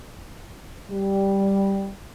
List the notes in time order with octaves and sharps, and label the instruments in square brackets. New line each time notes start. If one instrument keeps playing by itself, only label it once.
[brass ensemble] G3